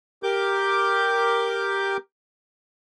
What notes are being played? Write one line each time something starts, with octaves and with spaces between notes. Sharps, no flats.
G4 A#4 D6 G6